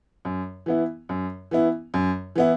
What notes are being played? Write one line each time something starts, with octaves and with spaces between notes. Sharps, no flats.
F#2
E3 B3 E4
F#2
E3 B3 E4
F#2
E3 B3 E4